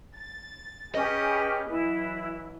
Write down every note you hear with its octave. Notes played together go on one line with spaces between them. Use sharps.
A6
C#4 G4 G#4 B4 D#5
E3 F#3 E4